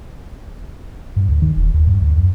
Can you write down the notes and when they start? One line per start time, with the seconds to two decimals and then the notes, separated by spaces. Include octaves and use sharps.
1.16 G2
1.29 D2
1.42 D#3
1.57 E1
1.74 D#2
1.87 G2
2.01 D2
2.18 F#2